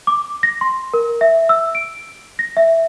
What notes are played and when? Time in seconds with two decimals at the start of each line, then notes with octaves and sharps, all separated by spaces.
0.07 D6
0.43 A#6
0.61 C6
0.94 A#4
1.21 E5
1.49 E6
1.75 D7
2.39 A#6
2.57 E5